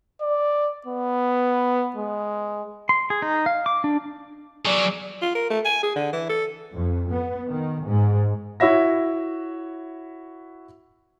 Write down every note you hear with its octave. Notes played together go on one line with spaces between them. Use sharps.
D5
B3
G#3
C6
G#4
D#4
F5
D6
D4
F#3 G#4 D5
F4
A#4
A3
G#5
G#4
D3
E3
A4
F2
B3
D#3
G#2
E4 F#4 C#5 E5 A#6